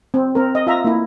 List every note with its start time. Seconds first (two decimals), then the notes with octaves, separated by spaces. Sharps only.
0.14 C4
0.35 C4 A#4
0.55 D#5
0.67 F4 E5 A#5
0.85 A#3 E4